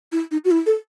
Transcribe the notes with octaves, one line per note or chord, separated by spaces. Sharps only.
E4
D#4
F#4
E4
A4